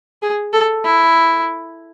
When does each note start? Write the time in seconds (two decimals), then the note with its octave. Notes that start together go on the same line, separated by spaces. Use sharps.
0.22 G#4
0.53 A4
0.85 E4